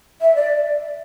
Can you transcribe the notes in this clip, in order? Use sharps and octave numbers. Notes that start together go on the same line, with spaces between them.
E5
D5